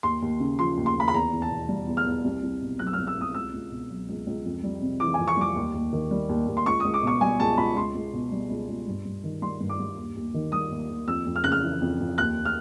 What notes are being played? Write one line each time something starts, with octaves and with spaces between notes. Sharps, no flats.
D#2 C6
D#2
C#3
F3 C6
D#2
C6
D#2 B5
B5
E2 A#5
E2
A5
B2
G3
E2
F6
E2
C2
C2
B2
F#3 F#6
E6
C2 F6
E6
C2 D#6
C#2 E6
C#2
B2
F#3
C#2
C#2
F2
G3
C3
E3 D6
F2 G#5
C#6
G3 D6
D#2
D#2
D#3
G3
D#2
D#2
C6
C#2 C#6
C#2 D#6
D6
B2 C#6
G3 G#5
C#2 A5
C#2 B5
C#2 C6
C#2
B2
G3
C#2
C#2
G2
G2
D#3
G3 C6
G2
D6
G2
D#2
D#2
D#3
G3 D#6
D#2
D#2
F2 E6
F2
F6
C#3 F#6
F6
E3
F2
F2
D#2 F#6
F6